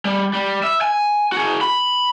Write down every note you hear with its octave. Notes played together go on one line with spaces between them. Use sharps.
G3
G3
E5
G#5
F#4 G#4
B5